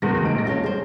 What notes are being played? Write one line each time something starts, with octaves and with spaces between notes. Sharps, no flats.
F#1 E2 G#3 A#6
F1 G#2 D7
A#1 A#6
C#4 F4 A4 C#5
G#4 C5